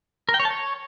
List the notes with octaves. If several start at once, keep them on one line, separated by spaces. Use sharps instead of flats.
A#4
G5
C#5
A5
C#5